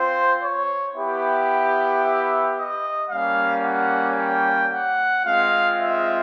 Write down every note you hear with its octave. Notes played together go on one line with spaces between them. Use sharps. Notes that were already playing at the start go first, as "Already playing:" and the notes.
Already playing: C4 F4 C5
C#5
B3 E4 G4
E5
D#5
G3 A#3 C#4 F5
F#5
G5
F#5
G#3 C4 F4 F5
E5